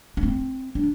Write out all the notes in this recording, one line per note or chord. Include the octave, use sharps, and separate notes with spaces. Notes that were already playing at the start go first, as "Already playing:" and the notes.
D4
C4
D4